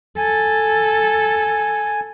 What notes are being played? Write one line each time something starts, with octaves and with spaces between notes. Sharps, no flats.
A4 G#5